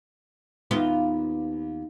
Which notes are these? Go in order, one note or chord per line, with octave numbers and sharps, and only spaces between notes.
D#2 B3 F4